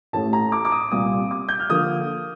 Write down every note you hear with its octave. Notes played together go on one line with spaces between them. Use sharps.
A1 A2 A3 A5
A#5
D6
D6
D#6
C2 A#2 G3 D#6
D6
G6
F6
D3 F3 A#3 D#6